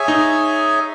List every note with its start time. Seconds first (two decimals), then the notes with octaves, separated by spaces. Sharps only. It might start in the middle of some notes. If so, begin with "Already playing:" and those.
Already playing: G#4 C#5 E5 G#5
0.08 D#4